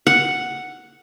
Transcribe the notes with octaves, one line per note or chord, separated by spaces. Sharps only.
F#5